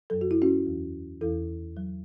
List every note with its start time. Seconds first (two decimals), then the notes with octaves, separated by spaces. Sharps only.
0.10 F#2 F#3 A4
0.21 F#4
0.31 E4
0.42 C#4 F#4
0.66 E2 E3
1.21 E2 E3 E4 A4
1.77 F#3